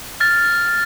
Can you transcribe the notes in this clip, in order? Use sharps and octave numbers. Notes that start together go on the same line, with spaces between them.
F6 A6